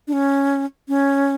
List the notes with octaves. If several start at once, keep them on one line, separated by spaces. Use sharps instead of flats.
D4
C#4
C#4